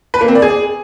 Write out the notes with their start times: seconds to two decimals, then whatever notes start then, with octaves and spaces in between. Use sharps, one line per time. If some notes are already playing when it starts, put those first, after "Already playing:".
0.14 B4
0.21 A#3
0.28 C4
0.35 D5
0.42 G#4